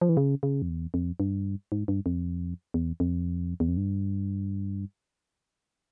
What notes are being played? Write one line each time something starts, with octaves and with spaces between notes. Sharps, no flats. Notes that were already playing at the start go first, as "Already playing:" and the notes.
F3
E3
C#3
C#3
F2
E2
F2
G2
G#2
G2
F2
E2
F2
E2
F2
G2